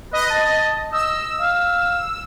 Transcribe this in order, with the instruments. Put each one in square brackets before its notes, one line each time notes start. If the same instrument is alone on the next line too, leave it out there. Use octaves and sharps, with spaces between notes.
[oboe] B4 [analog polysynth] D#5
[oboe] A5
[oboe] D#5 [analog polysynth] E6
[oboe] F5